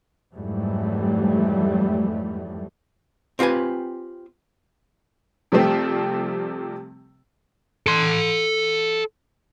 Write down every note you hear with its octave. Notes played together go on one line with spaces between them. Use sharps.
F2 G#2 E3 F#3 G3 A3
C4 F4 G4 B4 G#5
C3 F3 G3 A3 C4
A4 C6